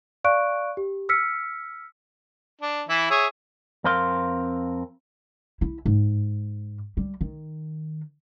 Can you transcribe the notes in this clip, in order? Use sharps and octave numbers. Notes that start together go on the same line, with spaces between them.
D5 F5 C#6 F#6 D7
G4
E6 F6 B6 C#7
D4
E3 E4
G#4 C#5 E5
F2 C4 A#4 F5 C6
E4
G#2
G3
D#3